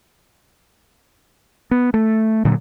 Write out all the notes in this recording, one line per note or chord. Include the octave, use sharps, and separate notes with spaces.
B3
A3
A#2 D3 F#3